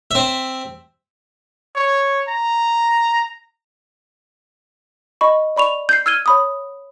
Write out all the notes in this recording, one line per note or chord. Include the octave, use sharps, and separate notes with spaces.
C4 E5
C#5
A#5
D#5 B5 C#6
D5 B5 C#6 F7
G6 C7
E6 F6 G#6 D#7 G7
C#5 B5 D#6